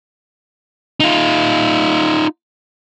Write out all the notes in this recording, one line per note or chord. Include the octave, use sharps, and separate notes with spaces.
D#4 F4